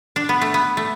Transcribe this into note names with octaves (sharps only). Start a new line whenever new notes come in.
D4
B3
A3
B3
A3